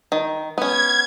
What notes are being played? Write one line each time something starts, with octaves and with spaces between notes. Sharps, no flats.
D#3
B3 C#4 G#6